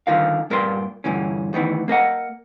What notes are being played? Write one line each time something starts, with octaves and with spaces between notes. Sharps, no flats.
D3 D#3 F4 A#4 F5
G2 A#2 A#4 B4 D5 C6
G2 A#2 D3 E3 C#4
D2 D#3 E3 B3
A#3 A#4 D#5 F#5